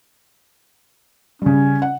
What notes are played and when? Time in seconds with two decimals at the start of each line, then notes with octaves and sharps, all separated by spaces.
1.42 C#3 G3 C#4
1.82 F#5